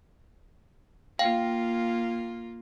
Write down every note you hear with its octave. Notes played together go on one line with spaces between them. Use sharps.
A#3 F4 F5 G5